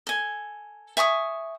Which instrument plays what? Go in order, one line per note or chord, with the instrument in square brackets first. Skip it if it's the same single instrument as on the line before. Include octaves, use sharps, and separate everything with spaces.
[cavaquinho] A4 G#5
E5 G#5 C#6 D#6